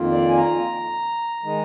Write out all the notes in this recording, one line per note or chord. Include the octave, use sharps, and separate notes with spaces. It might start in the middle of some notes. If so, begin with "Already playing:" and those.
Already playing: F2 D#3 A#3 F4
D5
G#5
A#5
D#3 G#3 D#4